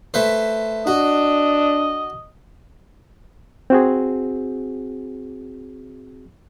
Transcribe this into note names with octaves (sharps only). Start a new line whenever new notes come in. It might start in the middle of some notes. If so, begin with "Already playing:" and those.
A3 B4 C5
D4 F#4 D#5
C4 F#4 G#4